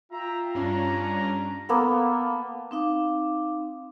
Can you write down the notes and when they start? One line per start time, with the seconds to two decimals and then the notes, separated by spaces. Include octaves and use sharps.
0.12 F4 E5 G5 A#5
0.55 G2 C#4 D4 A#5
1.69 A#3 B3 A4
2.71 C4 D#4 F5 D6